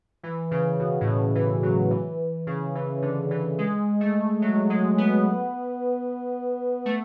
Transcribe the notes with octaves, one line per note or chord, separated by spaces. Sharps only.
E3
C#3
B2
A2
B2
E3
F#3
E3
C#3
E3
D3
E3
G#3
A3
F#3
G#3
B3
A3